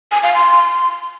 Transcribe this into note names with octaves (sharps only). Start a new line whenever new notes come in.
G#5
F5
C6